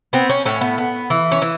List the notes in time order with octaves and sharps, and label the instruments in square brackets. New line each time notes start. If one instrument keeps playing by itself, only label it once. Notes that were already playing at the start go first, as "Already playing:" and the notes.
[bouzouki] B3 C4
C#4
A2 C#4
B3
B3
E3
C#4
E3